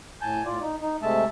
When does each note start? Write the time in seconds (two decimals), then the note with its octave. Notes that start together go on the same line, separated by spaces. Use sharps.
0.21 A2 G#5 A5 G6
0.45 A2 F4 D5
0.61 D#4
0.81 D#4
1.02 C3 G#3 A3 E5 A5